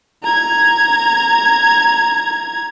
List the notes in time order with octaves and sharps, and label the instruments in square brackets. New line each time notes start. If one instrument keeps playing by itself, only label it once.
[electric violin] A#5 G#6